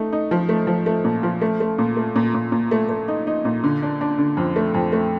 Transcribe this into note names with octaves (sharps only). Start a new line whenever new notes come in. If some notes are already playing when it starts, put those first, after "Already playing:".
Already playing: A3 D#4
D#4
F3
A3
F3
A3
A#2
F3
A3
A3
A#2
A3
A#2
A#2
A#2
A3
A3
D#4
D#4
A#2
D3
D4
D4
D3
F2
A3
F2
A3